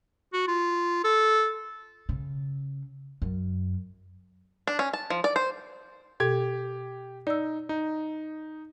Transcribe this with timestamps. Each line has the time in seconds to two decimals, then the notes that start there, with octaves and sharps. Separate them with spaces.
0.34 F#4
0.48 F4
1.04 A4
2.09 C#3
3.22 F#2
4.67 D4
4.79 C#4
4.93 A5
5.10 F3
5.24 D5
5.36 C5
6.20 B2 G4 A4 G#6
7.27 D#4 D5 E6
7.69 D#4